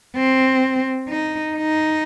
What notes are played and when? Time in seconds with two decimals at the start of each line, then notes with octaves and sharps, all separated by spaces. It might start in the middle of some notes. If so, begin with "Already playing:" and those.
0.16 C4
1.09 D#4
1.56 D#4